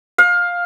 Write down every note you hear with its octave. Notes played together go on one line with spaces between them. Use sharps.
F5